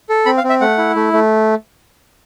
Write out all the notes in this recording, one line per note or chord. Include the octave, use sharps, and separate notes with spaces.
A4
C4 B5
F5
C4
E5
A3 F#5
E4
A3
A3